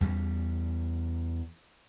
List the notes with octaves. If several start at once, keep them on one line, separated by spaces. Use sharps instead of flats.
E2 G3